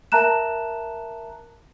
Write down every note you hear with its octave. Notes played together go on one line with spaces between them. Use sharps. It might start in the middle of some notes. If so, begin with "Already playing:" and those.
A#4 E5 A5 A#5 F#6 E7